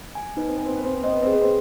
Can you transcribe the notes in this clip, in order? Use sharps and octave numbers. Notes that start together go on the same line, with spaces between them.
G#5
B3 D#4
C4
B3 G#5
C4
B3
C4 B4
B3
C4 D#5
B3
C4
G#4
B3
C4